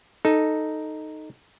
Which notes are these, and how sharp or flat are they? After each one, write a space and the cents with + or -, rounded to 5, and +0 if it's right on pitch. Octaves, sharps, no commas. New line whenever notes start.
D#4 +0 A4 +0